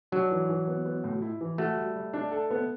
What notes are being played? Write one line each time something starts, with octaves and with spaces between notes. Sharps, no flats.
F#3 D4
E3
E3
B3
B3
A2
E4
E3
A3 F#4
G3
G3
D4
A4
B3